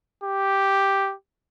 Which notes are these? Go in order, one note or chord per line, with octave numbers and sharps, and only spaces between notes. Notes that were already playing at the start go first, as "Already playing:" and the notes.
G4